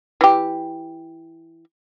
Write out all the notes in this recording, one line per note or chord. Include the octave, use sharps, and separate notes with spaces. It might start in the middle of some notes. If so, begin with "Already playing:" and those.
E3 G4